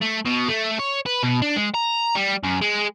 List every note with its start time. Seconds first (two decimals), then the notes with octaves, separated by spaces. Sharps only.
0.02 A3
0.26 B2
0.49 A3
0.79 C#5
1.06 B4
1.23 B2
1.42 D4
1.56 G#3
1.74 A#5
2.15 G3
2.44 F#2
2.62 G#3